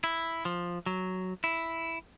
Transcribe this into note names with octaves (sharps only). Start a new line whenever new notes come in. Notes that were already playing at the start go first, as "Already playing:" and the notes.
E4
F3
F#3
E4